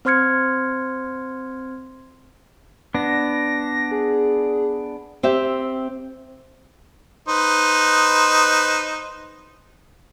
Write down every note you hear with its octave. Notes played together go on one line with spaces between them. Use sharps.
C4 C5 C6 F6 G#6 C#7
B3 D4 A#6
G#4
C4 G4 E5
D#4 B4 C5